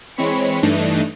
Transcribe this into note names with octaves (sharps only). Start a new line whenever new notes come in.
E3 G#3 C4 C#5 B5 C#7
G2 E3 A3 D4 D#4